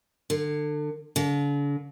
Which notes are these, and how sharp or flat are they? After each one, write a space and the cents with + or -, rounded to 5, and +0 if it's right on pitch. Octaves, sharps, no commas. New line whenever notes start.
D3 +30
D3 -45